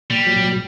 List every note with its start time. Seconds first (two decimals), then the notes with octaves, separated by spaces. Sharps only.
0.10 A#2 G3
0.27 F#3
0.44 A#2